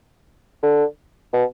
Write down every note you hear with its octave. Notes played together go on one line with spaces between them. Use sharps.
D3
B2